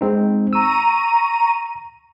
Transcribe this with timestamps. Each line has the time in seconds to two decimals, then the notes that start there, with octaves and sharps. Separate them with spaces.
0.01 G#3 C4 D#4
0.53 A#5 C#6 E6 D#7